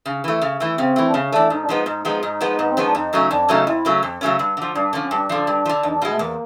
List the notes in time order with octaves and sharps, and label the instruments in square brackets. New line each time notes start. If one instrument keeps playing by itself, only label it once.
[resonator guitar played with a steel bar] C#3
E3 A3
C#3
E3 A3
[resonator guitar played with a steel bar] C#3 [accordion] C4
[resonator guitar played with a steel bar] E3 A3
[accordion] D4
[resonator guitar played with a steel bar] C#3 [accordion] C#4
[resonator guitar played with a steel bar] E3 A3 [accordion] D4
[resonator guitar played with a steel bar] G#2 [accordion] D#4
[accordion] D4
[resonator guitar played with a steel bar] F3 G#3 B3 [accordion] D#4
[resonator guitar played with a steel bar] G#2 [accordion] D#4
[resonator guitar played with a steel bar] F3 G#3 B3 [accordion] D#4
[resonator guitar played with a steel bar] G#2 [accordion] D#4
[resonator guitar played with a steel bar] F3 G#3 B3
[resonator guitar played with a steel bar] G#2 [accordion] B3
[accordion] C4
[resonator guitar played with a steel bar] F3 G#3 B3 [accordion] C#4
[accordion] D4
[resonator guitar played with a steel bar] F2 [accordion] D#4
[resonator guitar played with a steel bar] C#3 F#3 A3 C#4
[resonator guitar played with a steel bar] F2 [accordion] D4
[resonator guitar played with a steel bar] C#3 F#3 A3 C#4 [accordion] D#4
[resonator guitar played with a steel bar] F2 [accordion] E4
[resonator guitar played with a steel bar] C#3 F#3 A3 C#4
F2
C#3 F#3 A3 C#4
G2
D3 F3
[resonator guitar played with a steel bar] G2 [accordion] D4
[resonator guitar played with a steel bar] D3 F3 [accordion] C#4
[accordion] C#4
[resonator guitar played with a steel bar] G2 [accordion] D4
[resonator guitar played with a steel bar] D3 F3
G2
F3
D3
[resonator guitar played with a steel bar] E2 [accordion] D#4
[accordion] D4
[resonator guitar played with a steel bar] B2 G#3
[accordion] A3
[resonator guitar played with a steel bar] E2 [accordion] A#3